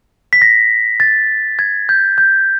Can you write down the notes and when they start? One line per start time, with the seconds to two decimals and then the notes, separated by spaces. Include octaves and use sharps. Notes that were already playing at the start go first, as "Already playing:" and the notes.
0.33 B6
0.42 A#6
1.00 A6
1.59 G#6
1.89 G6
2.18 G6